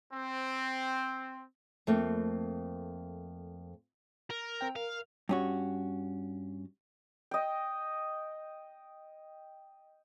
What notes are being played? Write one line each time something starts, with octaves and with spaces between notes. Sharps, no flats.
C4
F2 A3 A#3 C4
A#4
C4 G5
A#4 F5
G2 C#4 F#4
D#5 G5